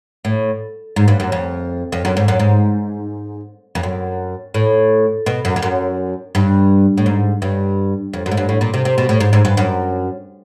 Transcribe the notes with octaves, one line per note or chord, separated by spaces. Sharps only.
A2
G#2
G2
F#2
F2
F2
F#2
G#2
F#2
G#2
F2
F#2
A2
B2
F#2
F2
F#2
G2
A2
G#2
G2
F2
F#2
G#2
G2
A2
A#2
C3
C3
B2
A2
G#2
G#2
G2
F#2